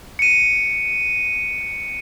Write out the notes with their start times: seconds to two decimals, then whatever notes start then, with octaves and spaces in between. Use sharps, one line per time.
0.19 C#7 D#7